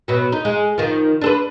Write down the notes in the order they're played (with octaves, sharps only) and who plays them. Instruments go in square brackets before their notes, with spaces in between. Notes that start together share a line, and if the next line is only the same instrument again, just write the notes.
[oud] B2 F#3
D#4
G#3
D#3 F3
D4 A4 B4